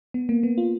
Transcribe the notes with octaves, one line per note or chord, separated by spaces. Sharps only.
B3
A#3
B3
F4